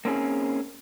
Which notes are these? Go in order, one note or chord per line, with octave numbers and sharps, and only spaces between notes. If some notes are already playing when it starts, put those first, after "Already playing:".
A#3 C4 C#4 G#4